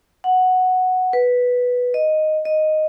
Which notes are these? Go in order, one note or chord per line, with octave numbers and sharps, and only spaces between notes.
F#5
B4
D#5
D#5